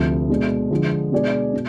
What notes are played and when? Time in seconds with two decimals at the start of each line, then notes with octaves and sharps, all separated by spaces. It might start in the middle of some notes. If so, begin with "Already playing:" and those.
Already playing: D2 C3 F3
0.29 B2 G#3 D4
0.71 D3 F3 G#3
1.12 B2 G#3 D4 G#4 D5
1.54 B2